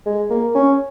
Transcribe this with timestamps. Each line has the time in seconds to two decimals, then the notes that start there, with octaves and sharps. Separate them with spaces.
0.06 G#3
0.30 A#3
0.55 C#4